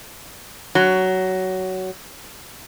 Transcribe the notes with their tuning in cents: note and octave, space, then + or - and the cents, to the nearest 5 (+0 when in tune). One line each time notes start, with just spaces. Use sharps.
F#3 +15